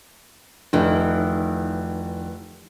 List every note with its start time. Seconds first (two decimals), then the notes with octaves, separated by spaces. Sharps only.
0.73 F1 D#3 E3